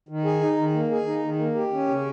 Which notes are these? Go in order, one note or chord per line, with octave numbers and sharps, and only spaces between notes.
D#3
G#4
D#4
D#3
A#3
G#4
D#4
D#3
A#3
G4
C#4
C#3